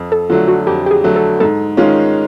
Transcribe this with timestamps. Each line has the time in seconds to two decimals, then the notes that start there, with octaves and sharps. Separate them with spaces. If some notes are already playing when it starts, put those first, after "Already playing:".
Already playing: F2
0.12 A4
0.30 D3 F#3 A3 F4
0.48 F#4
0.67 F2 G4
0.86 G4
0.91 G#4
1.04 D3 F#3 A3
1.16 A4
1.40 G#2 A4
1.77 D#3 G#3 C#4 F4